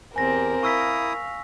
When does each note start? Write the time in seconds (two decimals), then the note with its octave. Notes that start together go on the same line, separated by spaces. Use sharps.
0.16 E2 C4 G4 A#4 G#5 A#6
0.63 E4 F5 C#6 D#6 E6 B6